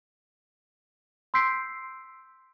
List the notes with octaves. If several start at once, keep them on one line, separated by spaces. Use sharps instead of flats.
C6 E6 G6 B6 C7 D7